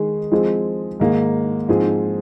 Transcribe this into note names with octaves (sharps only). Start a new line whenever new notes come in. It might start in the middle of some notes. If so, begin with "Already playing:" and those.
Already playing: D#3 G#3 D#4 G#4
F3 G#3 C4 G#4
G#2 D#3 A#3 G#4
G#2 F3 C4 G#4